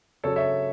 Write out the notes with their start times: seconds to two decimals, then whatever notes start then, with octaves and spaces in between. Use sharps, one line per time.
0.23 C#3 F#3 A4 C#5
0.36 C#5 E5